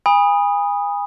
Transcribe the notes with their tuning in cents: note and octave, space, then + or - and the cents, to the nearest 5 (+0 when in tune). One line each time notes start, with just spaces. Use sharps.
G#5 -35 B5 -10 D#6 +0